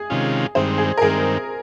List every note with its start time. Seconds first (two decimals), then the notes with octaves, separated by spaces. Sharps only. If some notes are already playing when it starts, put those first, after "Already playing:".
Already playing: G#4
0.10 C3 D#3 G#3 C#4 F4
0.55 G2 D#3 G#3 C4 C5
0.78 G#4
0.98 A#4
1.01 G2 D#3 G#3 C4 G#4